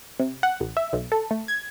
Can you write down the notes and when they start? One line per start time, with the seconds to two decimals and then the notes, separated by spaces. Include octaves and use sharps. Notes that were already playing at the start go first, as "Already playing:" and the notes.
0.19 C3
0.43 F#5
0.60 A1
0.77 E5
0.93 B1
1.12 A4
1.31 A3
1.48 G#6